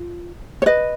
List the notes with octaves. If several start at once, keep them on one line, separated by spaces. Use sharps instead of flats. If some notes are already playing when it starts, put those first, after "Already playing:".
Already playing: F4
C#5
B4 D#5